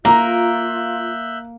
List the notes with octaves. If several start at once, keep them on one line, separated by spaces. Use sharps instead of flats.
A#3 F4 E5 A#5 F#6 G6